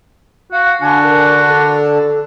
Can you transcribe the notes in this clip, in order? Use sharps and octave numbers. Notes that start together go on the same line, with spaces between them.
F#4 F5
D3 D4 F#4 G#5
A#4
A4